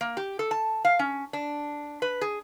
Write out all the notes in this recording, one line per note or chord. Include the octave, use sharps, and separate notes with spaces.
A#3
G4
A4
A5
F5
C#4
D4
B4
G#4